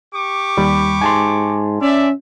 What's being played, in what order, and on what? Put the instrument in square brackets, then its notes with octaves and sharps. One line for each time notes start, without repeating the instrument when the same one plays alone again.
[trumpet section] G4 C#6 D6
[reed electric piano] D#2 G3 B5
[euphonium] G#2 [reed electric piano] G#5 A5 C6
[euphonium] C#4 [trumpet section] D5 E5